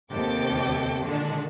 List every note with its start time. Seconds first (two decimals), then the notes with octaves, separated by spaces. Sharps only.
0.11 D#2 C3 B3 A4 G5 D6
1.04 A#2 D3 D#3 G#3 D4